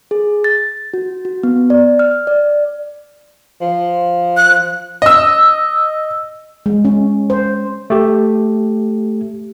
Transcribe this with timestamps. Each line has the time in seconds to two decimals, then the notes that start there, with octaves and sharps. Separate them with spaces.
0.11 G#4
0.44 A6
0.94 F#4
1.25 F#4
1.43 B3
1.70 D5
1.99 F6
2.27 D5
3.61 F3
4.37 F#6
5.02 D#5 E6
6.66 G#3
6.85 C#4
7.30 C5
7.90 A3 G4